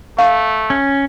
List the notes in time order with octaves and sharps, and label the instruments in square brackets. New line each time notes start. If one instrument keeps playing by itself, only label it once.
[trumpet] A3 [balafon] F5
[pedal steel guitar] C#4